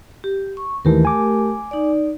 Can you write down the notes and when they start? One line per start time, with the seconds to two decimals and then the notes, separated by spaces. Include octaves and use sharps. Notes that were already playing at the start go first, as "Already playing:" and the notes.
0.24 G4
0.57 C#6
0.85 D#2 D#3 E3 A3 G4 A#4
1.05 G#5 D6
1.71 D#4 D5